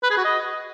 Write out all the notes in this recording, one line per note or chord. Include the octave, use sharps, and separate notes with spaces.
B4
G#4
F#4
D#5